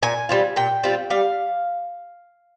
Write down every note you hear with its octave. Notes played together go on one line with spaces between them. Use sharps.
A#2 G#5
G3 C4 F4
A#2 G5
G3 C4 F4
G3 F5